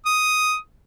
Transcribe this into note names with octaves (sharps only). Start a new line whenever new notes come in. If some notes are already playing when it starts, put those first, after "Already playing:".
D#6